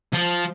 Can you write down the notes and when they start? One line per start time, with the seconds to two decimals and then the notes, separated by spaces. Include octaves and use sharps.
0.13 F3